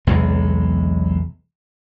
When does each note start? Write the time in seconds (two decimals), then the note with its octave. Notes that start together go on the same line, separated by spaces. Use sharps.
0.07 B1 E2 C3 G#3